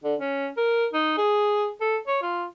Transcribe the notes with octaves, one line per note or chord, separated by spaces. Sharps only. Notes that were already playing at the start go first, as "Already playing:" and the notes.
D3
C#4
A#4
D#4
G#4
A4
C#5
F4